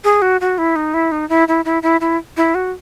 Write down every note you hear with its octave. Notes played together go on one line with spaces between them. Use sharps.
G#4
F#4
F#4
E4
D#4
E4
D#4
E4
E4
E4
E4
E4
E4
F#4